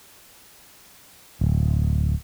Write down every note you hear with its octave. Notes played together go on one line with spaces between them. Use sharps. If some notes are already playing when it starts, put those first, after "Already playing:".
D1